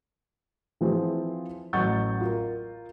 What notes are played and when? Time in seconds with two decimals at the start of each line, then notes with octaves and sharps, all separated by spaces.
0.81 E3 F3 C4 E4 F4 G#4
1.73 A1 F#3 F#5 C#6 G6 A6
2.21 F4 A#4